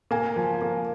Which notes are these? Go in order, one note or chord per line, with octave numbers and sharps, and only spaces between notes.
A#3 G#5
F3
A#3